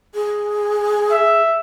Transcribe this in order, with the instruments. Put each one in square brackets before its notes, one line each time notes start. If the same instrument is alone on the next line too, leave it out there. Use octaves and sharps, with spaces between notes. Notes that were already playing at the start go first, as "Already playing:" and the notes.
[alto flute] G#4
[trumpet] E5